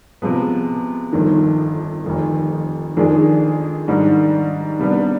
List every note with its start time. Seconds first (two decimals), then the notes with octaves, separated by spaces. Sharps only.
0.22 C3 F3 G#3 B3
1.13 G1 F2 D#3
2.04 F1 F2 D#3
2.97 F2 D#3 G#3 D4 G#4
3.88 G#2 D#3 G3 D4
4.79 C3 G3 B3 D4